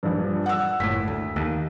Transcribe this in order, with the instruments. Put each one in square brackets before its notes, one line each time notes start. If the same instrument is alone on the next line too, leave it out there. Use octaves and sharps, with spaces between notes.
[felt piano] A#1 G2
F#5 E6
[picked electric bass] F#1 A2 [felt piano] B6
[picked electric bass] D2
D#2